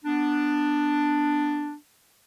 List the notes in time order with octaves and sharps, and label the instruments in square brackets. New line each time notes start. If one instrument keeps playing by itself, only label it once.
[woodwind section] B3 D4